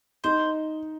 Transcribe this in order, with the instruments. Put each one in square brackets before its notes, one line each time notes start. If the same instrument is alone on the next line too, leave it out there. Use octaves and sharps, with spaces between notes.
[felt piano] D#4 [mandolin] C5